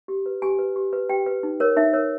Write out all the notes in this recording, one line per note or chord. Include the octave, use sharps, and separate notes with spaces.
G4
B4
G4 G#5
B4
G4
B4
G4 G5
B4
D#4
A#4 C#5
D#4 E5
A#4 C#5